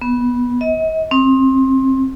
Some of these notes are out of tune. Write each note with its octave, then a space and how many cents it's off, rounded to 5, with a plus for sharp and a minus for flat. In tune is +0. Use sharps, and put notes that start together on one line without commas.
B3 -15
D#5 +40
C4 +25